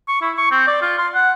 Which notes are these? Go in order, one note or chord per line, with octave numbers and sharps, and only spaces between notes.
C#6
E4
C#6
C4
D5
F4
C6
F#5